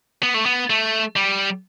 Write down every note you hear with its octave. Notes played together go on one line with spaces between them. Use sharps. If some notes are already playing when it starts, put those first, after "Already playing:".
B3
A3
B3
A3
G3